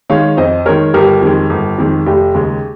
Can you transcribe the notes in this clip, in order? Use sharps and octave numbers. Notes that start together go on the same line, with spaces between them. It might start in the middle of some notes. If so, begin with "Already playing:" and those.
D#3 G#3 C#5 F5
F2 C5 D#5
D#3 G#3 A#4 C#5
G1 G4 A#4
F2 D#3 G#3
G1
F2 D#3 G#3
F1 G4
D#2 C#3 G#3